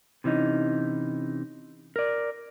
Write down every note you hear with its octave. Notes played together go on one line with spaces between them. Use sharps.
C3 E3 C#4 D#4
A#4 D5